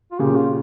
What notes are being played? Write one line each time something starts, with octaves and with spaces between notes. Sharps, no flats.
F4
A#2 C#3 G4
F4